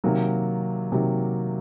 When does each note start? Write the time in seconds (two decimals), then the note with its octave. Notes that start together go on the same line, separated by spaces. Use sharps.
0.04 C3 D#3 F#3 A#3
0.92 C3 D#3 F#3 A#3